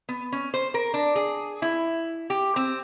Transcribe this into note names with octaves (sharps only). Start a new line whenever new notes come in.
B3
C#4
C5
A#4
D4
G#4
E4
G4
C4